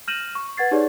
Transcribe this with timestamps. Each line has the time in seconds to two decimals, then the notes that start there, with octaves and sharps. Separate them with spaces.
0.08 F6 G6 A#6 D#7 E7 F#7
0.35 C#6
0.57 B4 F#5 G#6 A6 C7
0.71 D#4 G4 G#4 B4 C#5 D5